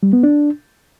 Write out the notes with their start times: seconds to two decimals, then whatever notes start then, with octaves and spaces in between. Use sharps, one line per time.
0.03 G3
0.13 B3
0.23 D4